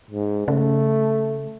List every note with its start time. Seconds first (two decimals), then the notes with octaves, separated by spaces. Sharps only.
0.11 G#2
0.48 C#3 A3